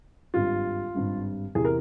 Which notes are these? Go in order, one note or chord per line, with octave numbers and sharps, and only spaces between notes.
G#1 G2 G3 F4
G#1 G2 G3
E2 C3 E3 G#4
A#4